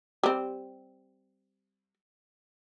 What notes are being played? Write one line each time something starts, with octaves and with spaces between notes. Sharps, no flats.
G3 C4